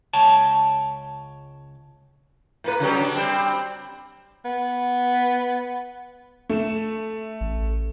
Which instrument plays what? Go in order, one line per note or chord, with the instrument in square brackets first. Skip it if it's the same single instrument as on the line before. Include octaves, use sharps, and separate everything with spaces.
[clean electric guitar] C#2 C#5 G5 A5
[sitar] A2 A#3 B4
C#3 F#3 G3
D4
G3 C4
[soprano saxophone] B3
[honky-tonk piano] A3 E7
[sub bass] A1